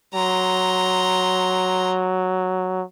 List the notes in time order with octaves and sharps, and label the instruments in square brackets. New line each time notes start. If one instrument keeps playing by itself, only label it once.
[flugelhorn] F#3 [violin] A#5 C6